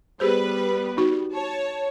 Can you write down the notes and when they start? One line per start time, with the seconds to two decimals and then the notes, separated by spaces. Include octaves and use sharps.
0.20 G3 B3 G4 G#4 B4 C5
0.97 D#4 F#4
1.33 C#5 A5